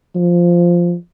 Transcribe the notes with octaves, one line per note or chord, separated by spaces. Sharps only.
F3